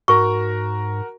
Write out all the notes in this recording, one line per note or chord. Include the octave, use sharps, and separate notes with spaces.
G#2 F#4 A#4 A#5 C#6